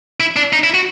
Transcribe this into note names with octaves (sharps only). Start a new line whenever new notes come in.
E4
D4
D#4
E4
F#4